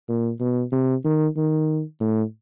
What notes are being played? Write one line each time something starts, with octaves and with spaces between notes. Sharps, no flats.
A#2
B2
C3
D#3
D#3
A2